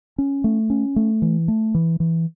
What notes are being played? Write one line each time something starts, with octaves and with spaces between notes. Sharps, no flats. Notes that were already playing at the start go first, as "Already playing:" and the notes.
C#4
A3
C#4
A3
E3
A3
E3
E3